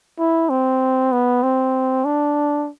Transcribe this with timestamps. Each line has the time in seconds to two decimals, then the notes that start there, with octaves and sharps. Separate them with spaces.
0.19 E4
0.50 C4
1.12 B3
1.43 C4
2.05 D4